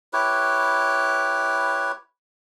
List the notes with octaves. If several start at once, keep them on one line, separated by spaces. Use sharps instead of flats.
E4 G4 B4 C#5